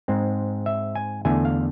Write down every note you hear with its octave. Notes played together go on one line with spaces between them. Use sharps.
G#2 G#3 C4
E5
G#5
E2 D3 A3 G#5
F5